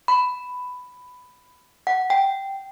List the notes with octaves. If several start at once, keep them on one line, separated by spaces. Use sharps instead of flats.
B5
F#5
G5